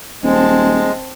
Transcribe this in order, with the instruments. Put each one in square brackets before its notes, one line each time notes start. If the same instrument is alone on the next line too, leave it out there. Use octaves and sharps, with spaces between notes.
[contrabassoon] D#1 [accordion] G#3 [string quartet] C4 A5